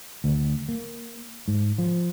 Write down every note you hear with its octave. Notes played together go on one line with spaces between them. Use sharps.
D2
A#3
G#2
F3